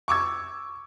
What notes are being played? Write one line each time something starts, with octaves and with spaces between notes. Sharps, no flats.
C#6 D6 E6 G#6